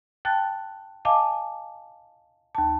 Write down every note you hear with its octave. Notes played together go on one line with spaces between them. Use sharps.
G5 A5 F#6 A6
D#5 F5 G#5 A5 D6
D#2 A5